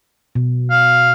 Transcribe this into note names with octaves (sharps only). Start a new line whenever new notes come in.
B2
F5